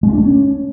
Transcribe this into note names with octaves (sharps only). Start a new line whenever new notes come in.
G#3
B3
D4
A3
C#4